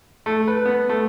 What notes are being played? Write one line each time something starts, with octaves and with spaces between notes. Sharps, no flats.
A3
B4
B3
A3